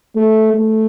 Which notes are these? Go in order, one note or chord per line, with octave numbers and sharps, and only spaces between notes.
A3
A3